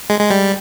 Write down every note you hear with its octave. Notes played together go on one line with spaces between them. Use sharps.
G#3
G#3
G3